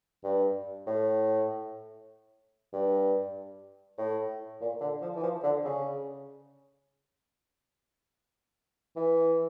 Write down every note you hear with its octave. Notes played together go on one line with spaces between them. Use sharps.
G2
A2
G2
A2
A#2
D3
F3
E3
F3
D3
C#3
E3